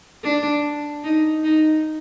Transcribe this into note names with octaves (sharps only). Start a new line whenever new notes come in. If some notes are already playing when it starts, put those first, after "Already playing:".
D4
D#4
D#4